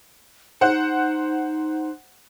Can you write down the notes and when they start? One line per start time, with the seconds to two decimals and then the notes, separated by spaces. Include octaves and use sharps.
0.61 D#4 C5 F#5 F#6